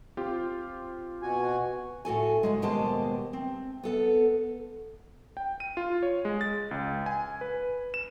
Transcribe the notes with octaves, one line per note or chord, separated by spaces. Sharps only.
C4 F4 G4
B2 F#4 G#5
A2 F#4 A4 G#5
D2 G#2 G#3
D#2 B2 G#3 G4 C5 A5
C4
B3 A4 F#5
G5
D#7
F4
C#5
G#3
A6
C#2
G#5
B4
E7